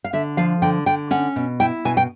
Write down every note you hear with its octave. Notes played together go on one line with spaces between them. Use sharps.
F5
D3 E5
F3 F5
D3 G5
D3 G5
C#4 F#5
B2
E4 G5
B2 G#5
G5